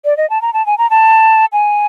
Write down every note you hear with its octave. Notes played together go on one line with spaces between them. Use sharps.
D5
D#5
A5
A#5
A5
G#5
A#5
A5
G#5